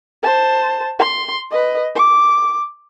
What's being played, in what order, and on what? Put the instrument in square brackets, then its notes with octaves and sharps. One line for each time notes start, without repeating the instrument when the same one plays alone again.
[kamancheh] C5 A5
C6
B4 D#5
D6